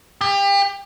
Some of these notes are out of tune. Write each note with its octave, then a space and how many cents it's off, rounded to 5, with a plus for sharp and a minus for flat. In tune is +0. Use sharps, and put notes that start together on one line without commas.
G4 +30